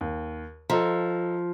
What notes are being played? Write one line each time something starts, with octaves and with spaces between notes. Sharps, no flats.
D#2
F3 A4 D#5 A#5